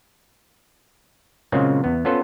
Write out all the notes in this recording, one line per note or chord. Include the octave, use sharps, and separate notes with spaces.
A#2 C#3 F#3 G#3 A#3 C4
E2 B3
B3 C#4 F4 A4 B4 C5